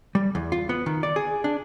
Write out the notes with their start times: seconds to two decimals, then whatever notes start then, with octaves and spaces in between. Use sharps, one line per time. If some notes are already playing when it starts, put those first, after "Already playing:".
0.15 G3
0.35 E2
0.52 F4
0.69 B3
0.86 D#3
1.03 D5
1.16 G#4
1.44 D4